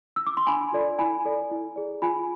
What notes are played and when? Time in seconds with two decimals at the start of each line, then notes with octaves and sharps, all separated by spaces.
0.16 E6
0.27 D6
0.37 C6
0.47 D4 G#5 B5
0.72 F4 A4 D5
0.99 E4 G#5 B5
1.25 A4 D5
1.51 E4
1.76 G#4 D5
2.02 F4 G#5 B5